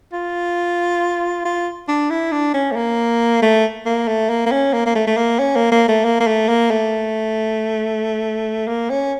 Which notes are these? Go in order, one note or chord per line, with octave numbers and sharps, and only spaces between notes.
F4
F4
D4
E4
D4
C#4
A3
A#3
A3
A#3
A3
A#3
A#3
C#4
A#3
A#3
A3
A3
A#3
C#4
A#3
A#3
A3
A#3
A#3
A3
A#3
A3
A#3
C#4